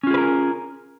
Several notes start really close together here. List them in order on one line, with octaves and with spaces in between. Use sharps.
C#4 F4 G#4 B4 A#4